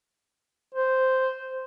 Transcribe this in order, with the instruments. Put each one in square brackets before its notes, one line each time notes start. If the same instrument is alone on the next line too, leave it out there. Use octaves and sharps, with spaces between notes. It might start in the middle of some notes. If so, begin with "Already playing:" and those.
[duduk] C5